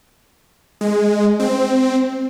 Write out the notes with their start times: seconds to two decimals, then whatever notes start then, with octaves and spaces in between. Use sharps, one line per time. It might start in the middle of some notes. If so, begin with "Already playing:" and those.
0.81 G#3
1.40 C4